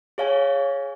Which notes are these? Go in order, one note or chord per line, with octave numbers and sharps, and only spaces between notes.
G#4 C#5 F5 G#5